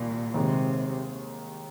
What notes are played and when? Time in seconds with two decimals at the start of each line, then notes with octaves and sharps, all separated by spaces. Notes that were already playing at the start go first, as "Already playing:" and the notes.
Already playing: C2 A#2 D#3
0.34 D#2 C3 D#3 G#3